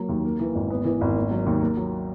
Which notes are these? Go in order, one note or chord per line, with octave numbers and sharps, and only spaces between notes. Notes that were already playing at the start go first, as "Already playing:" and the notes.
Already playing: F#3 A#3
D#2
A#3
E3
G#1
B3
E3
G#1
A#3
F#3
D#2
A#3
F#3